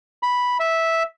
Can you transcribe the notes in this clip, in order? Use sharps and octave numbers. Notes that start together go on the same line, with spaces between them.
B5
E5